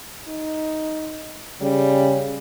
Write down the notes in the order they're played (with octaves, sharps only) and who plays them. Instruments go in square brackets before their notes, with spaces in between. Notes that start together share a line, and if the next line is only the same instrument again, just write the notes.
[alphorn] D#4
[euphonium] C#3 [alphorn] G3